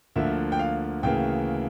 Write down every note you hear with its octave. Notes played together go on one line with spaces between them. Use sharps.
D2 D3 F3 A#3 E5
G5
F5
D2 C#3 E3 A#3 G5